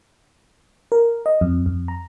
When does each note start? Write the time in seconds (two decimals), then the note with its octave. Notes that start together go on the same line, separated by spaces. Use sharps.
0.92 A#4
1.26 D#5
1.41 F2
1.66 F2
1.88 A#5